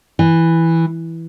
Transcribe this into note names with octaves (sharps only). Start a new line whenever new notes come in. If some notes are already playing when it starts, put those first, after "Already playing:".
E3